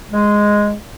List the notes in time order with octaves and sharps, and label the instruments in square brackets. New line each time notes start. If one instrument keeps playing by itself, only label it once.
[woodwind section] G#3